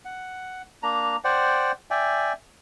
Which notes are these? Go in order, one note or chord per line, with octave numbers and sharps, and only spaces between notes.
F#5
A#3 D4 A#5
C5 D5 F#5 G5
D5 E5 G5 G#5